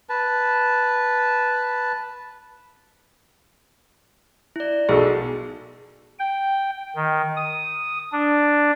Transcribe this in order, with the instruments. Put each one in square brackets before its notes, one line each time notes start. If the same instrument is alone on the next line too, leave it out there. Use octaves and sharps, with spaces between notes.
[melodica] B4 A5
[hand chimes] E4 D5
[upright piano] B1 F#4 A4 [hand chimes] G#4
[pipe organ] G5
D#3
D#6
D4